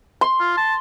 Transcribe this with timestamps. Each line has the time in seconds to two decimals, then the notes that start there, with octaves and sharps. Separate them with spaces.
0.21 C6
0.40 F4
0.57 A5